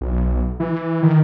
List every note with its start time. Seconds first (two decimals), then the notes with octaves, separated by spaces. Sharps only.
0.01 B1
0.60 E3
1.03 D#3